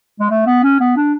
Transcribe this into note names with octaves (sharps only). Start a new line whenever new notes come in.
G#3
A3
B3
C#4
B3
D4